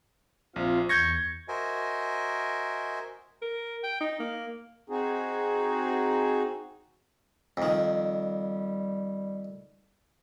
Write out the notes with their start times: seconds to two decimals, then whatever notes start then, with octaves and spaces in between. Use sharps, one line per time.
0.56 A#1 C4 F4 F5
0.89 E2 C#6 G6 G#6 A#6
1.48 F#4 A#4 C5 D#5 E5 G#5
3.42 A#4
3.84 G5
4.01 D#4
4.20 A#3
4.90 C4 D#4 F#4 G#4
7.57 F2 D#3 G3